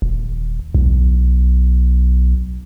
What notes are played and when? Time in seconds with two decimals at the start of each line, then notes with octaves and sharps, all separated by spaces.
0.02 D#1
0.74 B1